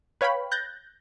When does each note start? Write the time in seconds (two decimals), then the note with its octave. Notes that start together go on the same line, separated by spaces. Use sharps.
0.21 B4 C#5 F5 G5 B5
0.51 F#6 G6 A6 A#6